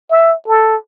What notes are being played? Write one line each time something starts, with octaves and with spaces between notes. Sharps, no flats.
E5
A4